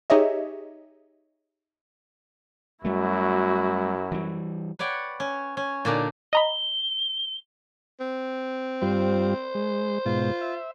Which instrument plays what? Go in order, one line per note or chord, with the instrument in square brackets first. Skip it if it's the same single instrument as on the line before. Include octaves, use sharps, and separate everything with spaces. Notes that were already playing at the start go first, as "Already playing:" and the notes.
[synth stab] D#4 G4 G#4 C#5 D#5 E5
[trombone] F#2 [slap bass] G3 A3 [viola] E4 F#4
[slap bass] E3 G3
[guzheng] B4 C#5 D5 F#5 G5
C#4
C#4
A#2 D3 D4 D#4
[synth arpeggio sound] D#5 A#5 B5 [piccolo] G7
[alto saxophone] C4
[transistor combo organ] G2 G3 F4 [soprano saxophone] C5
[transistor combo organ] G#3
[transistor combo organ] G#2 B2 [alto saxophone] F4
[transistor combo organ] E5